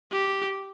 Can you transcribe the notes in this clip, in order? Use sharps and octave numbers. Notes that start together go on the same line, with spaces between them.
G4